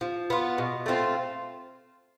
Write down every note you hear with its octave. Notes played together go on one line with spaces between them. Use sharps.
F3
B3 F4
B2
A3 C4 F4